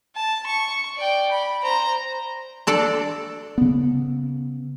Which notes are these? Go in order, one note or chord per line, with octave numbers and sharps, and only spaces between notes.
A5
C#6
D5 G5
B5
C5 A#5
D4 A4 D5
C#3 B3